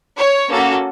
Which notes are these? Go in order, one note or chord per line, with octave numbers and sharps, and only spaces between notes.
C#5
A#3 C#4 F#4 A4